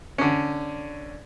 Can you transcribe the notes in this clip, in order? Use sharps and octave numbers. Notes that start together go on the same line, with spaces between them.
D3 C#4